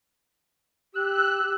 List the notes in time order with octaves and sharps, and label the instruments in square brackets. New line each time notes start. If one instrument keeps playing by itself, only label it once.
[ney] G4 [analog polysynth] E6 F#6